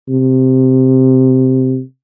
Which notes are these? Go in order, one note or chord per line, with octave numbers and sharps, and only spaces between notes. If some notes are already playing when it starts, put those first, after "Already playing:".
C3